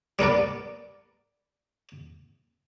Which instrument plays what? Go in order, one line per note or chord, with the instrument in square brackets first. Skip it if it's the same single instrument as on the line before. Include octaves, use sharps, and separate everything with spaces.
[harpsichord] G3 B3 A#4 D5